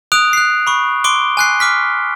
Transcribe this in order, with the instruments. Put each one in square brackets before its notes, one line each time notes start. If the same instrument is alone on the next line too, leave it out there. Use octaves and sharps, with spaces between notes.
[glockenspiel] D#6 F#6 D7 F7
F#6 C7
B5 C#6
C6 D6 D7 G7
G#5 F#6 C7
D6 F6 B6